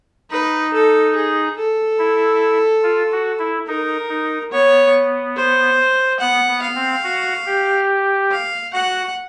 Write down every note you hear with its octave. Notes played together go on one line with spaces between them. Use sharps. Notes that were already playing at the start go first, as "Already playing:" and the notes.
D#4 B4
A4
G#4
A4
E4
F4
F#4
E4
D#4 A#4
D#4
B3 C#5
C5
B3 F#5
B3
F5
C4
F#4
G4
F5
F#4 F#5